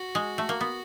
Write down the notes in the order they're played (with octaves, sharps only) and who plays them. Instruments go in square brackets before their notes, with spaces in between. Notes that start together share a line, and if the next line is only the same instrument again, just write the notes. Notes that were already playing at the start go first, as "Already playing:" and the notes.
Already playing: [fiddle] F#4
[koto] G#3
A3
A#3
B3